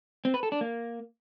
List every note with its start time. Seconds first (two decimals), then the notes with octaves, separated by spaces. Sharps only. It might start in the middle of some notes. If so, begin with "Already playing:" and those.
0.25 C4
0.34 B4
0.43 A4
0.52 D4
0.61 A#3